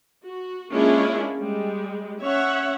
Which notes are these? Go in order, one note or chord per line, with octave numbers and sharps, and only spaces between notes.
F#4
G#3 A#3 C#4 D4 E4 F4
G3 G#3
C#4 C#5 E5 F#5